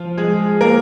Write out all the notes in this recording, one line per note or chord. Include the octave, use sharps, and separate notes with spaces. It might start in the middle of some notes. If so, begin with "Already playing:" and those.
Already playing: F3 F4
G#3 G#4
A#3 A#4